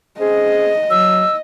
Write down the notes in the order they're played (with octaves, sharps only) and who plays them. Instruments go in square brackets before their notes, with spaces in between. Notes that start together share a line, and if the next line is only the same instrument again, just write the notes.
[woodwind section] C4 C#4 G#4 [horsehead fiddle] D#5
[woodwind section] F#3 [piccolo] E6